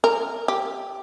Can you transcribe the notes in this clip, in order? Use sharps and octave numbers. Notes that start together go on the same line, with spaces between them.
A#4
G4